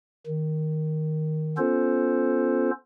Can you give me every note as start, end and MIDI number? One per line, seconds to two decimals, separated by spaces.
0.26 1.58 51
1.58 2.71 59
1.58 2.71 61
1.58 2.71 65
1.58 2.71 69
1.58 2.71 72